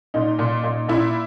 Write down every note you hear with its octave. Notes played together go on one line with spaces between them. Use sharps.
A#2 D#4
A#2
A#2
A#2 E4